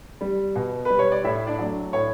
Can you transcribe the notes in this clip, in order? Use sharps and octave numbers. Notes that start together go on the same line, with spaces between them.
G3
B2
G3 B4
C#5
D5
A2 E4 E5
D4 D5
F#3 A3
A2 C#5